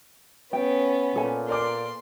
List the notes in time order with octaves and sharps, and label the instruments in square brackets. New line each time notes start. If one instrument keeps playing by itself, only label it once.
[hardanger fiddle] B3 C#4 [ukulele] G5
[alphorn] A#2 [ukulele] A4 G#5
[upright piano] A#4 D5 D6 [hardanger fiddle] C6